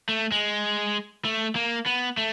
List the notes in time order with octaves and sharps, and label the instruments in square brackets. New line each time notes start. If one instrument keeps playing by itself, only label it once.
[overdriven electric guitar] A3
G#3
A3
A#3
B3
A3